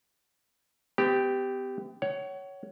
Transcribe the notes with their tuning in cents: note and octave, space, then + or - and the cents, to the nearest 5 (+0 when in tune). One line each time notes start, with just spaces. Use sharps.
B3 +40 G4 +0
C#5 +10 F#5 +35